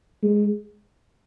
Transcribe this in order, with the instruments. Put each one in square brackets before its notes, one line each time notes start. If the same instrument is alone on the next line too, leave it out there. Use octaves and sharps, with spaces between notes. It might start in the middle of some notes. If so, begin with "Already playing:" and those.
[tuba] G#3